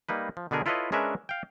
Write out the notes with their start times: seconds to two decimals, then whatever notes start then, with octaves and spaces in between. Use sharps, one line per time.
0.09 G3 A#3 D#4 B4
0.37 F3
0.51 B2 D3 B3 G#4 A#4
0.66 E4 F4 A4 B4 C#5 D#5
0.92 G#3 C#4 D4 A#4 B4 E5
1.29 F5 G5